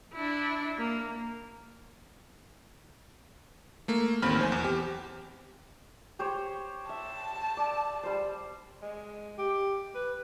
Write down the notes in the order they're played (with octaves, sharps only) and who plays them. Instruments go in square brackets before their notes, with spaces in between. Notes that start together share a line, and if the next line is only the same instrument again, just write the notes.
[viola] D4 E4
A#3
[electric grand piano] A3 A#3
A1 D#2 C4 B5 F6
B1 C5 G#5
E2
G4
[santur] G4 C5 C#5
[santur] E5 [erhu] A5
[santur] D5
G3 C5
[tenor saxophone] G#3
G4
B4